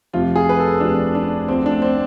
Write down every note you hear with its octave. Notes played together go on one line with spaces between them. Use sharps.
F1 F2 C3 F3 F4
G#4
B4
A4
F1 F2 C3 F3 D4
D4
D2 D3 F3 C4
D4
C4